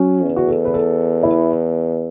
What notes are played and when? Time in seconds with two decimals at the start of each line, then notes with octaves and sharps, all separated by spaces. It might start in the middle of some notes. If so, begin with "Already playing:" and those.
Already playing: F#3 C#4
0.23 E2
0.36 F#4
0.48 A4
0.65 B4
0.74 A4
1.23 E4